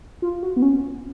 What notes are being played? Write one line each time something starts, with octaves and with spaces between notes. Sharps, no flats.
F4
F#4
B3
C#4